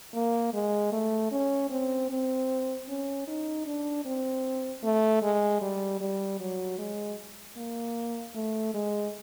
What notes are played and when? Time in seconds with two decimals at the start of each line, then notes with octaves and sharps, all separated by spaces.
0.14 A#3
0.54 G#3
0.92 A3
1.32 C#4
1.70 C4
2.10 C4
2.88 C#4
3.27 D#4
3.66 D4
4.05 C4
4.83 A3
5.22 G#3
5.61 G3
6.00 G3
6.40 F#3
6.78 G#3
7.57 A#3
8.35 A3
8.74 G#3